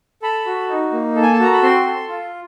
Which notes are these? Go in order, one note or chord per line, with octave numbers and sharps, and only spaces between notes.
A4 B5
F#4
D#4
A#3
A4
G#5
A5
F#4 A#5
B5
C4 C6
A4
F4